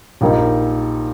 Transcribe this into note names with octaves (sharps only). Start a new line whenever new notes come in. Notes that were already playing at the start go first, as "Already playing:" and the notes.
A#1 A#2 G3 A#3 D#4